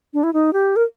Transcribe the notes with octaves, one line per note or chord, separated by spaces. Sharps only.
D4
E4
D#4
G4
A#4